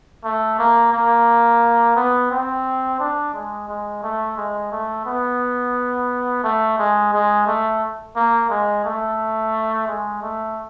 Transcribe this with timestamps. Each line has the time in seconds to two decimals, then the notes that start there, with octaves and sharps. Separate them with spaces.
0.24 A3
0.59 A#3
0.93 A#3
1.97 B3
2.31 C4
3.00 D4
3.34 G#3
3.69 G#3
4.03 A3
4.37 G#3
4.72 A3
5.06 B3
6.44 A3
6.78 G#3
7.13 G#3
7.47 A3
8.16 A#3
8.50 G#3
8.85 A3
9.88 G#3
10.23 A3